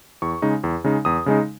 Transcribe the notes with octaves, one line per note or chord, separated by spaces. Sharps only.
E2 C#6
C#3 G#3 D#4
E2
C#3 G#3 D#4
E2 D#6
C#3 G#3 D#4